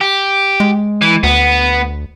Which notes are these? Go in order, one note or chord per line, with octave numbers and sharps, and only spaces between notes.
G4
G#3
E3
D2 B3